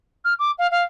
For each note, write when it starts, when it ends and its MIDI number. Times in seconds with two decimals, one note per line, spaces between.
0.24 0.34 89
0.39 0.51 86
0.58 0.67 77
0.71 0.83 77